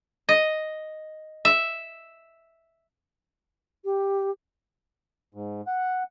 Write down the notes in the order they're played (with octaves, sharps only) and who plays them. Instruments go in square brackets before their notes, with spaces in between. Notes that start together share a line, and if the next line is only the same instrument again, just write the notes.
[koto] D#5
E5
[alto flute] G4
[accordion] G#2
F#5